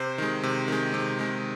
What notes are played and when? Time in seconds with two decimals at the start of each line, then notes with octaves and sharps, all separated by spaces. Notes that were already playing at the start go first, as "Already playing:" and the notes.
Already playing: C3 C5
0.18 D#3 G#3
0.43 C3
0.68 D#3 G#3
0.94 C3
1.19 D#3 G#3